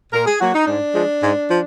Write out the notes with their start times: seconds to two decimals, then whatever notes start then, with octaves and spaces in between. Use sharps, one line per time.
0.12 A#2 A#4
0.26 G#4
0.39 F#3 A#3 F#4
0.53 D#4
0.67 G#2 D4
0.93 F3 G#3
1.21 G#2
1.49 F3